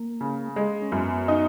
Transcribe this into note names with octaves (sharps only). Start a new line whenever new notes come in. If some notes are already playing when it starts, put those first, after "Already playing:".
Already playing: A#3
C#3
G#3
C#4
F#2 B3
D#4